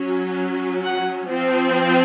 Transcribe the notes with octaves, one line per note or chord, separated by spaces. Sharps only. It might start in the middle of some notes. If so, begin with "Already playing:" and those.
Already playing: F#3 C#4
F#5
F3 C4